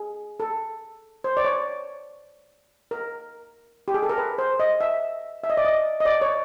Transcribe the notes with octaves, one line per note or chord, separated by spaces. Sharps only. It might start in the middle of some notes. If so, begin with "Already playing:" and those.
Already playing: G#4
A4
C5
D5
C#5
A#4
G4
G#4
A4
A#4
B4
C5
D#5
E5
E5
D#5
D5
D#5
D#5
D5
C#5